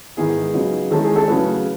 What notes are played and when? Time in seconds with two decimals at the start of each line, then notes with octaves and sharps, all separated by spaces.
0.17 G#2 D#3 G#3 B3 E4 G#4
0.54 C#3 F#3 B3 D#4
0.91 D#3 G#3 C#4 E4 A4
1.04 G#4
1.16 A4
1.28 C#3 F#3 A3 E4 B4